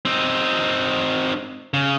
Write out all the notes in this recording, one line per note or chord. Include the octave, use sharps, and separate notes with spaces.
C4 D#4
C#3